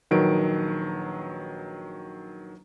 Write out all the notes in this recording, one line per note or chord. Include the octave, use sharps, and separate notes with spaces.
A#1 D#3 F#3 A#4 B4 D7